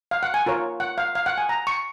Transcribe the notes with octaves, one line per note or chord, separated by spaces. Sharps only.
F5
F#5
G#5
F4 A#4 C#5
F#5
F5
F5
F#5
G#5
A#5
C#6